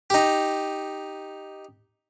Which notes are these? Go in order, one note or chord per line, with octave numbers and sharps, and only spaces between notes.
D#4 G4